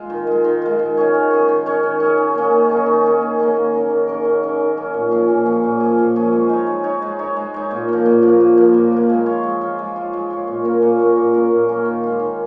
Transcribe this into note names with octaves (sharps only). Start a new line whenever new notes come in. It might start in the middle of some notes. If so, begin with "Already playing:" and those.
Already playing: G#3 F4
D#3
G#3 F4
D#3
G#3 F4
D#3
C#4 G#4 C#5
D#3
C#4 G#4 C#5
D#3
C#4 G#4 C#5
D#3
C#4 G#4 C#5
D#3
A#3 C#4 G#4
D#3
A#3 C#4 G#4
D#3
A#3 C#4 G#4
D#3
A#3 C#4 G#4
D#3
C#4 A#4
D#3
C#4 A#4
D#3
C#4 A#4
D#3
C#4 A#4
A#2
F3 C#4 G#4
A#2
F3 C#4 G#4
A#2
F3 C#4 G#4
A#2
F3 C#4 G#4
G#3
D#4 C#5
G#3
D#4 C#5
G#3
D#4 C#5
G#3
D#4 C#5
A#2
F3 A#3
A#2
F3 A#3
A#2
F3 A#3
A#2
F3 A#3
G#3
F4 C#5
G#3
F4 C#5
G#3
F4 C#5
G#3
F4 C#5
A#2
A#3 C#4 A#4
A#2
A#3 C#4 A#4
A#2
A#3 C#4 A#4
A#2
A#3 C#4 A#4
D#3
G#3 F4
D#3